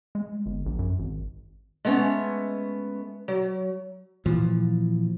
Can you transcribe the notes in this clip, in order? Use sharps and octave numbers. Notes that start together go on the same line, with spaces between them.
G#3
G1
A#1
F#2
G#1
G#3 A3 B3 C#4
F#3
A#2 E3 F3